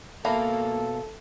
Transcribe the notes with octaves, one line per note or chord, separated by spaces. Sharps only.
B2 A#3 A4 A#4 E5 F5 A5 B5